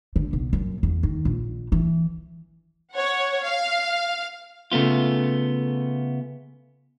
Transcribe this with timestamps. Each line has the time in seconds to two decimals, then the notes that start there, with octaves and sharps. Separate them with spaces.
0.16 D3
0.33 B1
0.53 F#2
0.83 E2
1.03 D#3
1.25 A#1
1.72 E3
2.92 C#5 F#5
3.42 F5
4.72 C#3 A3 B3 F4